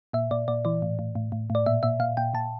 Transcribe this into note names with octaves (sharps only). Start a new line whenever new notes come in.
A#2 E5
A#2 D5
A#2 D5
E3 D5
A2
A2
A2
A2
A2
D5
A#2 E5
A#2 E5
A#2 F5
A#2 G5
A#2 A5